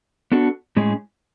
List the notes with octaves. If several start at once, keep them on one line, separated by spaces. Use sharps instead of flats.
B3 D4 F#4 A4
A2 G#3 C#4 G#4